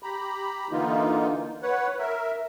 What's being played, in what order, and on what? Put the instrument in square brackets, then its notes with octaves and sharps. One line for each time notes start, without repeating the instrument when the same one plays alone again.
[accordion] G4 A#5 B5
D3 E3 A#3 D#4 F4
B4 C#5 F#5
A#4 E5